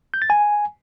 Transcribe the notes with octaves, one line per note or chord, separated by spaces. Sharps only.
G6
A6
G#5